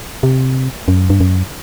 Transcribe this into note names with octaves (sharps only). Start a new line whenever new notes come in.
C3
F#2
G2
F#2